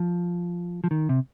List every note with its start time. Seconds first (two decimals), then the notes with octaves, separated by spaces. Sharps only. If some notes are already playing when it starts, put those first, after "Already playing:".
Already playing: F3
0.84 F3
0.91 D#3
1.09 C3